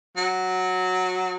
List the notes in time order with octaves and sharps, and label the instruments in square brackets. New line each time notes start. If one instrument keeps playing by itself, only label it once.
[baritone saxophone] F#3